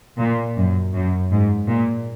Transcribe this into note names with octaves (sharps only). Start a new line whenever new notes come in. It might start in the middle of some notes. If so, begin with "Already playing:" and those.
A#2
F#2
F#2
G#2
A#2